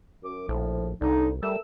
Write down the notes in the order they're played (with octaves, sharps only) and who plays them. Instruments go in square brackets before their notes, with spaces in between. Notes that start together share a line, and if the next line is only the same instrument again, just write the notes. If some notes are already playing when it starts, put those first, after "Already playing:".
[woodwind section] F#2 D6
[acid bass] A#1 [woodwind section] A2 F3
[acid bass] C2 [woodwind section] D3 D#4
[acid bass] G3 [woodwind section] A3 A#4 E6